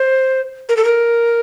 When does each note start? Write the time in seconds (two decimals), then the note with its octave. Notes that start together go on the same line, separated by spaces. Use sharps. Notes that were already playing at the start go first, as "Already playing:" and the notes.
Already playing: C5
0.69 A#4
0.77 A4
0.85 A#4